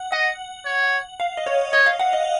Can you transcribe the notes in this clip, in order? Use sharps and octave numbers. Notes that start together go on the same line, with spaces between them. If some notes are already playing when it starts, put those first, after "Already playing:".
Already playing: F#5
D#5 F#5
C#5
F5
D#5
C#5
C#5 D#5
F5
F#5
D#5